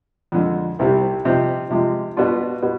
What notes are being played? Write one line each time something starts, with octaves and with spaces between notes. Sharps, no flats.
F2 D3 G#3
C2 C3 G3
C3 F3 C4 D#4
C3 F3 G#3
B2 B3 D4 F4
B2